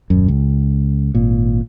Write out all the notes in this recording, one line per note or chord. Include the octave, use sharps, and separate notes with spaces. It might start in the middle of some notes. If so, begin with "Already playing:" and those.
D#1 F#2
C#2
G#1 A#2